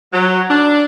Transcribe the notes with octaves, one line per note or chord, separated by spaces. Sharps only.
F#3
D4